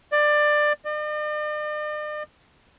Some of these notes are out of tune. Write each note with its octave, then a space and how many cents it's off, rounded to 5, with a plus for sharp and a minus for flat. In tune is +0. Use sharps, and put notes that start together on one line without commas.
D5 +20
D5 +45